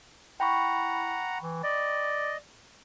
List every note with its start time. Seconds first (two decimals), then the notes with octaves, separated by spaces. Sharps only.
0.40 E4 F#5 G5 A#5 B5 C#6
1.43 E3
1.64 D5 D#5